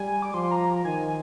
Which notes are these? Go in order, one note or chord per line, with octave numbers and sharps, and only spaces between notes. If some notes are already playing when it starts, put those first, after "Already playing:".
Already playing: G3 G#5
D6
F3 C6
A#5
D#3 G#5